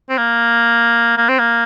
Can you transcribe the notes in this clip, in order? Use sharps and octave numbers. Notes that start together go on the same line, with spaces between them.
C4
A#3
A#3
C4
A#3